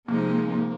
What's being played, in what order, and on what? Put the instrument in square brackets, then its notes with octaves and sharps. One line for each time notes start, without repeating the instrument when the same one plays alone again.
[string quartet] C3 F3 G#3 C4 D#4 [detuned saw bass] A#3